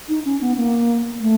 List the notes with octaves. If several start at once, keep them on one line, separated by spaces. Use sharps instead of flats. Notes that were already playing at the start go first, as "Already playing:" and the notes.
D#4
C#4
B3
A#3
A3